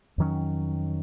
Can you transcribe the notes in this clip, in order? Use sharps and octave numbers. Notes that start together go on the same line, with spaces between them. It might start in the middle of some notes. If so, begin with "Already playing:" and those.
F2 D#3 F#3 C#4